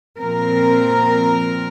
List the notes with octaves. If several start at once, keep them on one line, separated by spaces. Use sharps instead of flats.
A#2 F3 C4 A#4